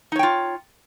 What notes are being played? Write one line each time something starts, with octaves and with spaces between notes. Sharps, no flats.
D#4 F4 C#5 G5